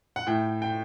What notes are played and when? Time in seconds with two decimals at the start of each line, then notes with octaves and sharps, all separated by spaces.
0.16 F#5
0.27 A2 G5
0.62 G5